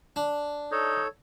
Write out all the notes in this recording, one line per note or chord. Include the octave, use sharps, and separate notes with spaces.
D4
D#4 A4 C#5